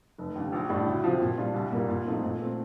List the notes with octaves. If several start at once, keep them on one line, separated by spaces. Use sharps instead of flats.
F1
D#2 D3
A#1
A2 G3 D4 G4
D2
C3 F3
A#2
G3 D4 F4
C2
A#2 G3 A#3
A#2
F3 A3 C4 D#4
A#2
A3 C4